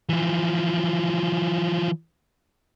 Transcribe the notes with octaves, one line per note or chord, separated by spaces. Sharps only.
E3 F3